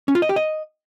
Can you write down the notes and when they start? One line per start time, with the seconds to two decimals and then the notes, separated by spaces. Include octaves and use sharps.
0.08 C#4
0.15 F4
0.22 D#5
0.29 G4
0.36 D#5